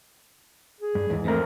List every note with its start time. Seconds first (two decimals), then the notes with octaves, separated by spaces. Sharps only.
0.80 G#4
0.95 G2
1.10 E2 G#2 E3
1.25 F2 A3 A#4